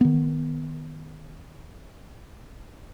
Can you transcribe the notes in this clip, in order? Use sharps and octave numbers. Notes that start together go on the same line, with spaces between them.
D#3 B3